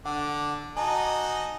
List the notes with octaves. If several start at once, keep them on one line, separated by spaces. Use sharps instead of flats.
D3 F#5 D6
D#4 F#4 D#5 G#5 A5